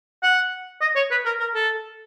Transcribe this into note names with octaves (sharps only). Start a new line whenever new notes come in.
F#5
D#5
C#5
B4
A#4
A#4
A4